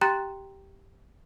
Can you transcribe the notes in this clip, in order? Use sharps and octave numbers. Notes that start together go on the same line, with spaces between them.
G4 G5 A#5 C6 F#6 A6